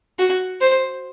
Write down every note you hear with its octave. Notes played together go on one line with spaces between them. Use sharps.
F#4
C5